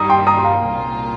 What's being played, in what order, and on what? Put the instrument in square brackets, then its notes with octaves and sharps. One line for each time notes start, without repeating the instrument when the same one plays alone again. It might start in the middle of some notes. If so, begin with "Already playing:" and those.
Already playing: [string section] G2 D#3 G3 [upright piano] A#5 D#6
[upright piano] G5 C6
A#5 D#6
C6
F5 A#5
[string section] C2 A#2 A#3 F4